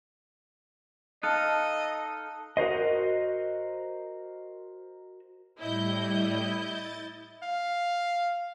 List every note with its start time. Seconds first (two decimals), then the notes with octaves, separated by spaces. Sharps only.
1.23 D#4 A4 D#5 F5 A5 F#6
2.57 F#4 A#4 C5 D#5
5.60 A2 G3 E4 D#5 G6
6.57 A6
7.43 F5